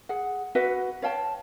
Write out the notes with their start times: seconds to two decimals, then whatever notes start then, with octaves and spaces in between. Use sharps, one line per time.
0.09 G#4 F#5
0.55 F#4 B4 E5 F#5
1.02 C#5 F5 G5 A5